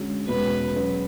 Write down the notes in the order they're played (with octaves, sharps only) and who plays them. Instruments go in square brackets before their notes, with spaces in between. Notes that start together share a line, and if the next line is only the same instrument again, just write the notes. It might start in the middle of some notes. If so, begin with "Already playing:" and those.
Already playing: [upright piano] D3 G#3 C#4 F#4
[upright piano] E2 B2 G#3 C#4 F#4 [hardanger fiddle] B4
[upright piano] F#3 C#4 G#4 B4